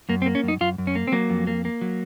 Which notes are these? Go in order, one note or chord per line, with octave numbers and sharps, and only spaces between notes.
F#2 A#3
C4
A#3
C#4
F#2 D#4
F#2 F4
F#2
C#4
A#3
C4
F#3 A#3
F2
A#3
A#3
F#3